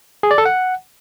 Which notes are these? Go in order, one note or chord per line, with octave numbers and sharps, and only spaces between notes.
G#4
D5
A4
F#5